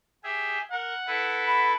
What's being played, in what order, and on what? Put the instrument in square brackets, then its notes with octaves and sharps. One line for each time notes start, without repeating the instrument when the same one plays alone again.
[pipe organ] G4 G#4 E5
[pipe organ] A#4 [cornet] F#5
[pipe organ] E4 A4 B4
[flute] B5